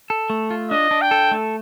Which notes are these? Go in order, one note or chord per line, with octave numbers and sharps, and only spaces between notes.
A4
A3
F4
D4 D#5
D4
G5
A4
A3